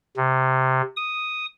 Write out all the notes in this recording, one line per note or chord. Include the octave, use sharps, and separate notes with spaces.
C3
D#6